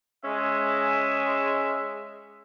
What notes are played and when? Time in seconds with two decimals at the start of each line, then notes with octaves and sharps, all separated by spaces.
0.25 G#3 C#4 E5